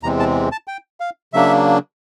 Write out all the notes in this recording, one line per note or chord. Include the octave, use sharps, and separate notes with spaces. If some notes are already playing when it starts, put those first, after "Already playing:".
E2 C3 E3 G#3 C4 A#5
A5
A5
G5
F5
C#3 F#3 A#3 D4 E5